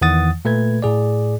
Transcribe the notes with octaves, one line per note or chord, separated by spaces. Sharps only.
E2 D#3 E3 F#5 D#6 A6
A#2 A3 B4 G#6
A2 G#4 D5